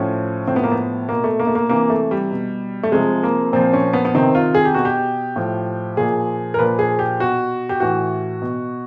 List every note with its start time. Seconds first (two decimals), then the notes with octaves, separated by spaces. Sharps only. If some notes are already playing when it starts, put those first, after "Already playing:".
Already playing: A2 F3 C#4
0.47 A2 F3 C4
0.56 B3
0.63 A#3
0.72 B3
1.09 B2 A#3
1.24 A3
1.39 A#3
1.47 A3
1.55 A#3
1.69 C3 E3 A#3
1.90 A3
2.11 G3
2.31 B2
2.83 A3
2.92 C3 F3 G#3
3.23 A#3
3.53 A#2 F3 C4
3.73 C#4
3.93 B3
4.05 B3
4.14 C3 D#3 C4
4.35 F4
4.55 G#4
4.65 G4
4.74 B2 F#4
4.85 G4
5.36 A2 F3
5.97 A#2 F3 G#4
6.54 A#4
6.59 A#2 F3 B4
6.79 G#4
6.99 G4
7.20 B2 F#4
7.69 G4
7.80 A2 E3 F#4
8.42 B2